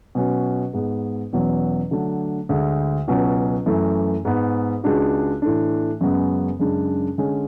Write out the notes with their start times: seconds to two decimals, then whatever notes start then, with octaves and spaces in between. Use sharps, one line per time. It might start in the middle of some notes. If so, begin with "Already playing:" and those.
0.15 B2 F#3 C#4 F#4
0.73 G#2 G#3 B3
1.33 E2 B2 F#3 C#4
1.91 D3 F#3 A3 D4
2.49 D2 D3 G#3
3.08 C#2 B2 F#3 C#4
3.66 F#2 E3 A3
4.25 G#2 G#3 B3
4.83 C#2 C#3 G#3 D4 F#4
5.42 A2 E3 A3 D4
6.01 F#2 C#3 G#3 B3
6.59 F#2 C#3 G#3 D4
7.18 D3 G#3 C#4